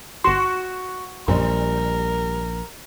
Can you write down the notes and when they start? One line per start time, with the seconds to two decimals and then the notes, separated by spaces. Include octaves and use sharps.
0.24 G1 F#4 C6
1.28 A#1 F#2 G3 A#4